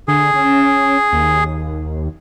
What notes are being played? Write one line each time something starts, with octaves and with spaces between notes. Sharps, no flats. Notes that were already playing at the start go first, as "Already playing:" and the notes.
D3 G#4
C#4
D#2